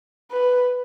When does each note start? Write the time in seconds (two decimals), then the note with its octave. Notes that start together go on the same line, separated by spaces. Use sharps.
0.31 B4